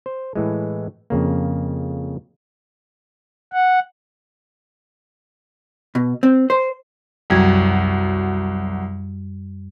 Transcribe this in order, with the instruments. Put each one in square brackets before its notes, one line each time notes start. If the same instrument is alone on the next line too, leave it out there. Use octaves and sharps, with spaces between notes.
[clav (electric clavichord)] C5
A2 E3 G#3
F2 C#3 A#3
[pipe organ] F#5
[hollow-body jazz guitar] B2
C4
C5
[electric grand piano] C2 F#3 [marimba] F#2 G3 G#6